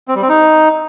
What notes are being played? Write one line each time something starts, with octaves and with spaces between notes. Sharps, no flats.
C4
G3
C4
D#4